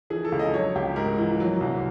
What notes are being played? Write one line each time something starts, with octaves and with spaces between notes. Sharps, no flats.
E3 G#4
A4
C#2
D#5
F#3 C#5
C#2 G4
G#2 A#4
E3
F#3
C2